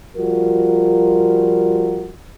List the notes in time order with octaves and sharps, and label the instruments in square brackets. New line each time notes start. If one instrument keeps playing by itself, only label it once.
[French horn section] F3 G3 F4 F#4 A#4